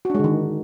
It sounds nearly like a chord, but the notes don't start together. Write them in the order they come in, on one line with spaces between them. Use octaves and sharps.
F#4 D4 G#3 D3 D#3